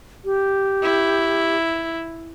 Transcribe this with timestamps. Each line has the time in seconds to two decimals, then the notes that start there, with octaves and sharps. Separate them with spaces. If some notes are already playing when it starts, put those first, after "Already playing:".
0.25 G4
0.83 E4